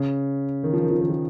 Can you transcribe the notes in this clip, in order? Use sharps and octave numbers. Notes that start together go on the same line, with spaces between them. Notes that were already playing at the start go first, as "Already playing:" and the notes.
Already playing: C#3
D#3
F3
D#3
F3
D#3
F3